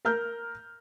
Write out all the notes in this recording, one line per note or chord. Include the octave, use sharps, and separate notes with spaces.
A#4 A#5 F6 G6